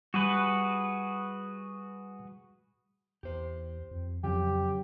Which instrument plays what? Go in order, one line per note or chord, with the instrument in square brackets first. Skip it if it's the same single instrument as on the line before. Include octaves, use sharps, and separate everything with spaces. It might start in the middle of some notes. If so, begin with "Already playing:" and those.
[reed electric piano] G3 [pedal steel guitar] F#4 G#4 B4
[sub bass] E2 [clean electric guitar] G4 C5
[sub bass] F2
[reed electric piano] F2 [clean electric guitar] C#3 [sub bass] F#3 [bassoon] G4